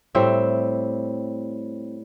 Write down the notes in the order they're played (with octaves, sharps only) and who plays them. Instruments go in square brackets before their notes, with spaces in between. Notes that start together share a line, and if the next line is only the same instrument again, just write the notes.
[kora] A2 G3 C4 E5